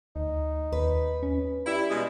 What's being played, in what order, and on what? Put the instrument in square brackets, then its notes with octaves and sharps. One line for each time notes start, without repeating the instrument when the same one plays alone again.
[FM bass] D2 [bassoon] D#4
[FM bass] D#2 [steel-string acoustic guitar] B4
[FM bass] C#4
[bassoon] G3 [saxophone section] E4
[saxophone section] B2 G#3